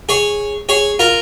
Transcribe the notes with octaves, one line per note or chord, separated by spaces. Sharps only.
G#4 C#5
G#4 C#5
F4 A#4